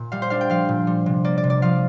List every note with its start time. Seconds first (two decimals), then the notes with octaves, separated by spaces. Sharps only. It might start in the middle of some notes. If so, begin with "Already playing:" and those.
Already playing: A#2
0.12 G3 F5
0.22 C5
0.30 D4 F5
0.41 G5
0.50 F3 F5
0.69 A#2
0.87 G3
1.06 C3
1.24 A#3 D5
1.38 D5
1.44 C3
1.50 D5
1.62 F3 F5